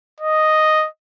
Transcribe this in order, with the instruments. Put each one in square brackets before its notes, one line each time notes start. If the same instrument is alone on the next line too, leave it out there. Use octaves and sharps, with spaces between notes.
[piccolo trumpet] D#5